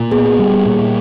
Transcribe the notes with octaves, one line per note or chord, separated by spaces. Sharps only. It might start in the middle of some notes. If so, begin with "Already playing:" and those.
Already playing: A#2
B3 G#4
G3
A#2